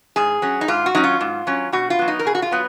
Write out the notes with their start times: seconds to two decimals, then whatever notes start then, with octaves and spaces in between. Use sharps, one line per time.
0.16 G#2 G#4
0.42 F#3 C#4
0.61 D#4
0.68 G#2 F4
0.86 F#4
0.95 F#3 C#4 D#4
1.04 F4
1.21 G#2
1.47 F#3 C#4
1.72 B2 F#4
1.90 F4
1.99 F#3 B3
2.08 D#4
2.19 A#4
2.25 B2 G#4
2.35 F#4
2.42 F4
2.51 F#3 B3